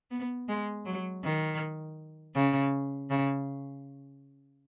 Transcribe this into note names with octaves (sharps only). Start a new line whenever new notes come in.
B3
G#3
F#3
D#3
C#3
C#3